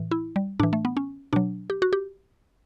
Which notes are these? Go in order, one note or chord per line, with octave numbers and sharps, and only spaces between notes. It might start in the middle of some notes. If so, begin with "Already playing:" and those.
Already playing: A2 E3
E4
G3
A2 E3 D4
A3
B3
C#4
B2 F#3 D4
G4
F#4
G4